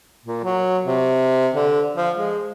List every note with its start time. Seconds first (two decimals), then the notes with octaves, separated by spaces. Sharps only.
0.25 A#2
0.44 F#3
0.86 C3
1.54 D3
1.96 F3
2.15 G#3